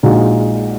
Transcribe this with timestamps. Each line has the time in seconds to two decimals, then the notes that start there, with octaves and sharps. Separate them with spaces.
0.03 A#1 A#2 G#3 D#4 F#4